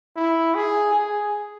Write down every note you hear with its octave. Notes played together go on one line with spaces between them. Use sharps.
E4
G#4
G#4